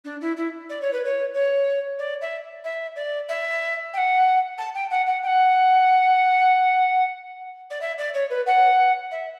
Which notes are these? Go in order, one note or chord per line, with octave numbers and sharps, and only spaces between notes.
D4
E4
E4
D5
C#5
B4
C#5
C#5
D5
E5
E5
D5
E5
G5
F#5
A5
G5
F#5
F#5
G5
F#5
D5
E5
D5
C#5
B4
F#5
E5